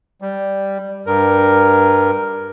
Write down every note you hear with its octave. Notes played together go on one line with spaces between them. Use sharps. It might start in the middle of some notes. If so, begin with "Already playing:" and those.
G3
G2 A#4